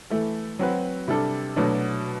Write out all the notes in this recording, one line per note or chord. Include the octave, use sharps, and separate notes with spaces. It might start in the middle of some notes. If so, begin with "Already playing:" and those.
E3 A3 E4 A4
F#3 C4 F#4 B4
C3 G3 D4 A4
B2 F#3 A3 D4